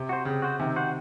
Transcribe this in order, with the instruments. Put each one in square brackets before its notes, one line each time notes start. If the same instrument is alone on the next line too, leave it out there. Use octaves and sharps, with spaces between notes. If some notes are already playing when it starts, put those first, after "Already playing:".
Already playing: [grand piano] C3
[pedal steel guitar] F#4 C5
[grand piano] C#3 [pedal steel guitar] C4
[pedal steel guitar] F#4 C5
[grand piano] C3 D#3 [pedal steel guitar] C4
[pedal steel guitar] F#4 C5